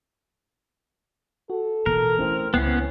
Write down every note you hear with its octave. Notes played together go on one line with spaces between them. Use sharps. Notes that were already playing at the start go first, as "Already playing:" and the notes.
F#4 A4
B2 E3 A#4
A3 C4 C#4 E4
C#2 B3 C#4 E4 G5 C7